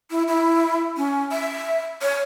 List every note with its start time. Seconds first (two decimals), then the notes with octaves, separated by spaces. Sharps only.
0.11 E4
0.28 E4
0.97 C#4
1.31 E5
2.02 C#5